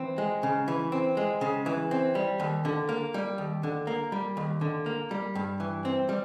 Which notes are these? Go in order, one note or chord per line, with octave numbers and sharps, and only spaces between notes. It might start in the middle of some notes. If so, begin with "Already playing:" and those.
Already playing: E3 C4
G#3
C#3
E3
C4
G#3
C#3
E3
C4
G3
D#2
D3
A#3
G3
D#2
D3
A#3
G3
D#2
D3
A#3
G3
G2
E3
C4
G3